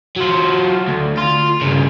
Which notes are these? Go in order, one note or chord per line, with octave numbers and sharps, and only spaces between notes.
F#3 F4
D2
F4
G2 C#3